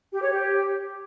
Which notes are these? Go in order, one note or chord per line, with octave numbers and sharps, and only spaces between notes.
G4
C#5
G4